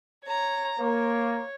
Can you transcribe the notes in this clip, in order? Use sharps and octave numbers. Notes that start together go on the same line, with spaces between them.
C#5 A#5
A#3 C#5